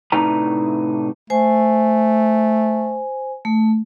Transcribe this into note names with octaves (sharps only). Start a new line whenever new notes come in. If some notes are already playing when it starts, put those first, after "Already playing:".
A2 C3 D4 D#4 B4 A#5
A3 C5 G#5
A3